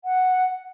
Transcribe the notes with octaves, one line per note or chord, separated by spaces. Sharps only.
F#5